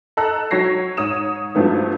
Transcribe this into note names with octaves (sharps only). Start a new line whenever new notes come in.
A4 D#5 A5 A#5 E6 F#6
F#3 F#4 C#5 A#6 C7
G#2 C#5 D#6 E7
G2 F3 F#3 A3 B3 E4